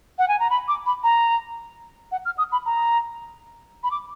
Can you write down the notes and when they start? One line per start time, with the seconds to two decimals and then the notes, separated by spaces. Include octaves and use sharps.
0.18 F#5
0.28 G#5
0.39 A#5
0.50 B5
0.68 D6
0.86 B5
1.03 A#5
2.12 F#5
2.25 F6
2.38 D#6
2.52 B5
2.66 A#5
3.83 B5
3.91 D6